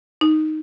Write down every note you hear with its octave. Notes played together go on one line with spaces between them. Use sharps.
D#4